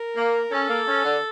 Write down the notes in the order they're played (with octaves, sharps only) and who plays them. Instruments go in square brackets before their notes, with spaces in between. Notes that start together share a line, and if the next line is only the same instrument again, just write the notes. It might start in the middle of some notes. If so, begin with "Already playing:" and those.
Already playing: [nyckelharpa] A#4
[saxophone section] A#3
[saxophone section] C#4 [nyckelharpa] A4
[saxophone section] A#3
C#4
D3